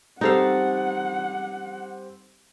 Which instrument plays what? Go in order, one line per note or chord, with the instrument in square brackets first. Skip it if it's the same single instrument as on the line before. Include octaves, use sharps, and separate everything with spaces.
[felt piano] G3 C4 G4 [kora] D#4 A4 F5 [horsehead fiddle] F#5